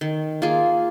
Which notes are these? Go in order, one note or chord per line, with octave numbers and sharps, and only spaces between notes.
D#3
A#3 F4 G#4